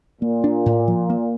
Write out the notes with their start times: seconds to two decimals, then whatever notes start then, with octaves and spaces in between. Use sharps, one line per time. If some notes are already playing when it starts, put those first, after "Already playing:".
0.21 A#2 A#3
0.44 D4
0.66 A2
0.88 F3
1.10 A#3